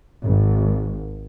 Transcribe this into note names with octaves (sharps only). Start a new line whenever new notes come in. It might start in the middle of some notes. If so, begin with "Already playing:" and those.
G#1